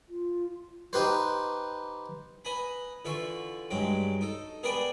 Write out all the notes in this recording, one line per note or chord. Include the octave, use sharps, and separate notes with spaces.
F4
D#4 G4 B4 C5
B4 D#5 G#5 A#5 B5
D3 E3 F4 E5 C#6
G2 F#3 G#3 G5
D#4 A4
B3 G#4 A#4 B4 D5 G5